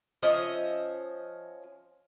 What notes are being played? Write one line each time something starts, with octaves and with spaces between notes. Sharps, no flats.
F3 C#4 D#5 E5